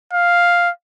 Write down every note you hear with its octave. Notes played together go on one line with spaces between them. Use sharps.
F5